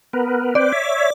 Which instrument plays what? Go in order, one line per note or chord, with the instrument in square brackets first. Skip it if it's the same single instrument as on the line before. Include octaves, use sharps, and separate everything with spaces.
[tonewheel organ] B3 A#4 B4
[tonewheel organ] C4 B4 C5 [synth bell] D5
[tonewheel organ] C#5 E5